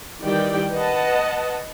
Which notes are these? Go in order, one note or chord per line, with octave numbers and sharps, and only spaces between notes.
D#3 E3 G3 G4 D5 G5
B4 D#5 F#5 A5